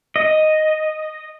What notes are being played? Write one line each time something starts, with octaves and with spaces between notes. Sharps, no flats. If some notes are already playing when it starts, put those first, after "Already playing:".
D#5